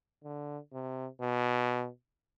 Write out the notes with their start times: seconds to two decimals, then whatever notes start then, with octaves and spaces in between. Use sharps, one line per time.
0.24 D3
0.73 C3
1.20 B2